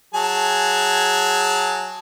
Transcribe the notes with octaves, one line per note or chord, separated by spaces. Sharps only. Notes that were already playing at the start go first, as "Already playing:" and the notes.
F#3 G#4 A5